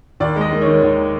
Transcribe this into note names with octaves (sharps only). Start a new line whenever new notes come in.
D#2 D5
G#3
D#5
D#3
D#3 C#5
D#2